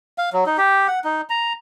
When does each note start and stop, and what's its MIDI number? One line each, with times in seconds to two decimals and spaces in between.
0.18 0.30 77
0.33 0.44 54
0.46 0.57 63
0.58 0.87 67
0.88 0.99 78
1.04 1.21 63
1.30 1.53 82